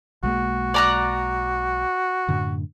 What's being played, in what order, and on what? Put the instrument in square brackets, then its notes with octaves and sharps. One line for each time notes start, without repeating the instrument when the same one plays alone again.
[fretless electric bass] B1 G#3 A#3 [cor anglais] F#4
[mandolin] D5 A#5 F#6
[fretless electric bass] F#2 A2 D3